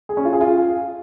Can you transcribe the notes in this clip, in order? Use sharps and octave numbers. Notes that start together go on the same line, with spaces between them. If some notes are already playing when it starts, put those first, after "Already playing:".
G#4
C#4
F4
G#4
F4